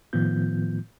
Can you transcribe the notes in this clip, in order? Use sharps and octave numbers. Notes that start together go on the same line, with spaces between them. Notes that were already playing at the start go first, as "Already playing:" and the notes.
A2 D#3 F3 B3 F4 G6